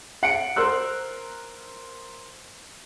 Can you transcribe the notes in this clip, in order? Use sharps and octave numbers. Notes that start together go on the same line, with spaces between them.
F#5 C#7 D7
A#4 C5 E6 F#6